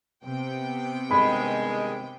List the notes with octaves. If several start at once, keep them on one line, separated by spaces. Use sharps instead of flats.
C3 B3 G5
G2 D#3 G#3 B5